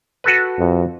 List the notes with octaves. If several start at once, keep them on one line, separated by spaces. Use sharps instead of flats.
F#4 A4 B4
F2